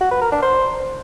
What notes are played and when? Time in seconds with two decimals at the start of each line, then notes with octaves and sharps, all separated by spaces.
0.01 F#4
0.11 B4
0.22 A#4
0.32 D4
0.42 C5